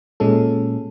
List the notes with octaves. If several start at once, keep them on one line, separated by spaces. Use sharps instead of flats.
A#2 G#3 C#4 A4